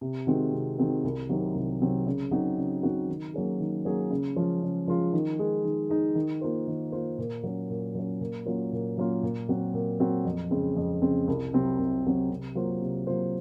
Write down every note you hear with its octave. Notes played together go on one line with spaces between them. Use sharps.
C3
D#3 G#3 C4 F#4
C3
D#3 G#3 C4 F#4
C2
C3 D#3 F#3 C4
C2
C3 D#3 F#3 C4
C#3
F#3 C4 D#4 F#4
C#3
F#3 C4 D#4 F#4
D#3
F#3 A#3 C#4 G#4
D#3
F#3 A#3 C#4 G#4
C#3
F3 G#3 C#4 F4
C#3
F3 G#3 C#4 F4
D#3
G#3 D#4 G#4
D#3
G#3 D#4 G#4
D#3
A#3 F4 C5
D#3
A#3 F4 C5
A#2
F#3 C#4
A#2
F#3 C#4
A#2
F#3 A#3 C#4 F4
A#2
F#3 A#3 C#4 F4
A#2
F#3 C4 F#4
A#2
F#3 C4 F#4
F2
C#3 G#3 C4
F2
C#3 G#3 C4
C2
C3 F#3 C4
C2
C3 F#3 C4
C3
F#3 A#3 F4 C5
C3
F#3 A#3 F4 C5